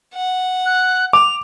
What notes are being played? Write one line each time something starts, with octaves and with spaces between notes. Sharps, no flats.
F#5
F#6
D6 F7